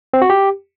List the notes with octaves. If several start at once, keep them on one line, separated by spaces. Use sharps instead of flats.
C4
F#4
G4